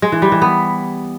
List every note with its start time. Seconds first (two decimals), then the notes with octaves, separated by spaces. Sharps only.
0.02 G#3
0.12 E3
0.22 G3
0.32 E3
0.42 B3